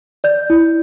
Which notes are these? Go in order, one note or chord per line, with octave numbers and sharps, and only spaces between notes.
D5 G6
E4